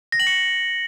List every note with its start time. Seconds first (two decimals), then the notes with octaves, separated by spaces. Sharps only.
0.12 A#6
0.20 F#7
0.27 C#7